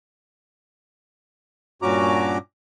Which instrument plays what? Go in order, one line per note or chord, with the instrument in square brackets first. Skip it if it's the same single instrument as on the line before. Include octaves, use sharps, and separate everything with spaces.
[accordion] G2 A#2 C#4 F#4 A#5 D6